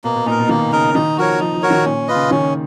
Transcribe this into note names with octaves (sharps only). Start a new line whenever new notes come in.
B2 A#3
B2
A#2 D#4 A#4
B2
D#3 A#3
C#3 D#4 A#4
D#3 D#4
F3 F#4 A#4 C#5
F3 D#4
F3
F#4 A#4 C#5
D#3
A#2 C#4
F4 B4 D#5
C#3
D#3 C#4